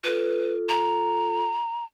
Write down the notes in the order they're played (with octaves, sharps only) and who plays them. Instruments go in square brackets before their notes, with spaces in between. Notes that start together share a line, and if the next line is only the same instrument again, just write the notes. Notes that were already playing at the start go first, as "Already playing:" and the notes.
[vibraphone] F4 A4 [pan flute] B4
[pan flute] A#5